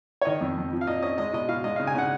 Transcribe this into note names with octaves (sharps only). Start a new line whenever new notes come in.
C#5
D#3 D#5
F2
F2
F3
F5
A#2 D#5
C#4 D#5
G#3 D#5
B2 D#5
B2 F5
G#3 D#5
C#3 F5
G#5
C#3 F#5